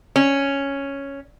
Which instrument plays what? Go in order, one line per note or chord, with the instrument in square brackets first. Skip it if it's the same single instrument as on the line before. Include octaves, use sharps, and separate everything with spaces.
[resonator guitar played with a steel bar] C#4